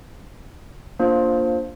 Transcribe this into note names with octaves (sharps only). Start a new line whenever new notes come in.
A#3 D4 F4 C5